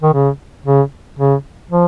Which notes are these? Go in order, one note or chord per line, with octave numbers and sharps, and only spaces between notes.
D#3
C#3
C#3
C#3
F3